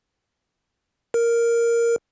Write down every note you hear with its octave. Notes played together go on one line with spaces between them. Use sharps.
A#4